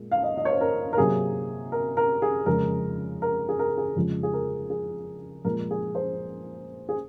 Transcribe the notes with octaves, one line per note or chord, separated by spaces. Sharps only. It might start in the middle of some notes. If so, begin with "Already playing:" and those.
Already playing: A#2 G#3
F5
D#5
D#5
C#5
C5
A#4
A#4
C3 F#3 A#3 G#4
A#4
A#4
G#4
F2 C#3 G#3 A#4
A#4
G#4
A#4
G#4
F2 C#3 F3 G#3
G#4
A#4
G#4
A#2 F3 G#3 A#4
G#4
C5
G#4